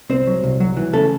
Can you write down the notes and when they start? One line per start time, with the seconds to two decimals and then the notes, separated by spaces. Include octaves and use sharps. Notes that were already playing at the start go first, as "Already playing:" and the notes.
0.09 C2 C4 C5
0.27 F#3
0.44 C2
0.60 F#3
0.77 E3
0.93 C#3 A3 A4